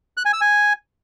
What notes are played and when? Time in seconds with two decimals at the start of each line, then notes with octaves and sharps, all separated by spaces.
0.17 F#6
0.25 G#5
0.33 E6
0.41 G#5